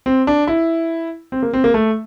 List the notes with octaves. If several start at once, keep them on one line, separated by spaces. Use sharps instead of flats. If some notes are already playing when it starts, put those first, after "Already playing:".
C4
D4
E4
C4
A#3
C4
A#3
A3